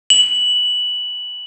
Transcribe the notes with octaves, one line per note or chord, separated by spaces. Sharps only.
F#7